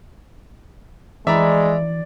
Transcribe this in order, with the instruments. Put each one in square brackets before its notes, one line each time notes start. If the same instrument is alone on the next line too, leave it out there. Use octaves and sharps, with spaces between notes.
[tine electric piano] E3 [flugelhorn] G#3 [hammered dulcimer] D5 [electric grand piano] E5 A#5 B5